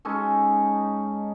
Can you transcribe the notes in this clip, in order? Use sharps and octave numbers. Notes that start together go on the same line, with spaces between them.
G#3 C#4 D#4 A4